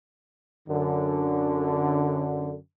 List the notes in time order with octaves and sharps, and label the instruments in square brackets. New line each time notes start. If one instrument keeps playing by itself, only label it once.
[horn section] F#2 D3